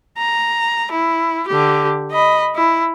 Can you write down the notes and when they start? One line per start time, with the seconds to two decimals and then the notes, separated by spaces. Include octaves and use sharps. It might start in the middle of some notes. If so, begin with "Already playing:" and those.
0.18 A#5
0.91 E4
1.48 D3 G4
2.11 D#5 B5
2.55 E4